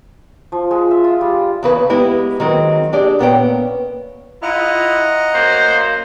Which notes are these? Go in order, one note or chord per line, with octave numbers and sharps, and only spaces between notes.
F3
G#3
E5
F4
G3
E2 C#3 B4
G#3 B3 E4 G4
D#3 F#3 G#3 C4
D4 G4 G#4 D5
A#2 B3 C#4 G5
G#3 E4 F4 D#5 F#5 A#5
F#2 A3 A#3 C5